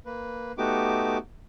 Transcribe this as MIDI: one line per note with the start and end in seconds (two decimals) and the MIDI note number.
0.06 0.52 58
0.06 0.52 71
0.58 1.18 57
0.58 1.18 59
0.58 1.18 63
0.58 1.18 66
0.58 1.18 67
0.58 1.18 86